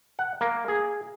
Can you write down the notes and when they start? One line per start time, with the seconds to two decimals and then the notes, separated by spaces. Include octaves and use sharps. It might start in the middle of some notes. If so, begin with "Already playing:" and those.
0.19 F#5
0.41 A#3
0.68 G#4